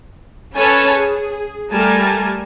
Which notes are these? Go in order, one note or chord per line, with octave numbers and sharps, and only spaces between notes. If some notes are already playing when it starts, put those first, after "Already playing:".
C#4 A4 B4 C#5 G#5 A5
G#4
G3 A3 A#4 G#5 A5